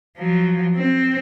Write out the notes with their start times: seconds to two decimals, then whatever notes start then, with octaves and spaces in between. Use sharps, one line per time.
0.18 F3 F#3
0.75 C4